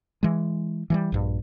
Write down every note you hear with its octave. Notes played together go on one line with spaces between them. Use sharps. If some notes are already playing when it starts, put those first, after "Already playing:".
E3 G#3
E3 F#3 G3
A#1 G2